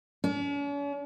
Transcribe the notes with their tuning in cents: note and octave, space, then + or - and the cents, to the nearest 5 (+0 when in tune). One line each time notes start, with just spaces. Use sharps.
C#4 +45